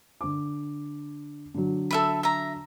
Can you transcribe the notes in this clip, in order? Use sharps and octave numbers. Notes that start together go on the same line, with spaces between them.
D3 D6
D3 F#3
A4 E5 B5
E5 A#5